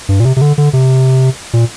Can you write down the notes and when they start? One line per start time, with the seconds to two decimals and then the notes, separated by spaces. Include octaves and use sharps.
0.09 G2
0.20 A#2
0.25 C3
0.36 C3
0.41 D3
0.58 D3
0.73 C3
1.53 A#2